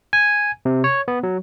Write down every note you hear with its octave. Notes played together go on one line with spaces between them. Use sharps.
G#5
C3
C#5
B3
F#3